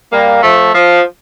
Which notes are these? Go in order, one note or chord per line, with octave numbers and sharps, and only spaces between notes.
G3 A#3
F3 A3
F3